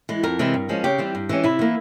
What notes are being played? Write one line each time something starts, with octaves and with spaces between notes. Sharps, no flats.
E3 G#3
F2 A#4
C3 E3 G#3
G2
F3 G#3 C#4
C#3 G4
E3 G3 C4
G2
E3 G#3 C#4
C3 E4
E3 A#3